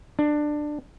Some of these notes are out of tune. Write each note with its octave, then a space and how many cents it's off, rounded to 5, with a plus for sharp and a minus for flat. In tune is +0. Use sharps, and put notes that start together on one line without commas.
D4 +15